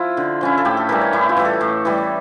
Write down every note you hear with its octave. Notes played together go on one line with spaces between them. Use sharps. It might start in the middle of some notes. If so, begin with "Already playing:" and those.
Already playing: F3 E4 F4
D3
F3 C#4 E4
A4
A2 G4
A4
E3 G3 A#4
C#5
A2 E4
F4
E3 G3
A4
A2
E3 G3